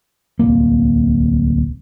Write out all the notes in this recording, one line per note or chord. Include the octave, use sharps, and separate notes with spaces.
D1 C2 A#3